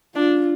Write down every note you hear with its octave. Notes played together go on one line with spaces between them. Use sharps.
D4 F4